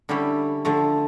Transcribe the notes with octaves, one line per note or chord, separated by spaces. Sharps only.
D3 G3 C#4 E4 G4
D3 F3 A3